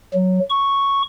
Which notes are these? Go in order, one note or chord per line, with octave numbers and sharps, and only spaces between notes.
F#3
C#6